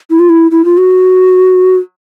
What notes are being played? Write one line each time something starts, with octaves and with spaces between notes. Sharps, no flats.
E4
F4
E4
E4
F4
F#4